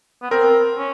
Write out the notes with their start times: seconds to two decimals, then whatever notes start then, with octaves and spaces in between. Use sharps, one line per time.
0.22 B3
0.31 C4 A#4
0.78 C#4